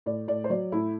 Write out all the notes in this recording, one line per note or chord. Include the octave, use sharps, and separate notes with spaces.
A2 D5
A2 D5
C5
F#3 D5
A2 E4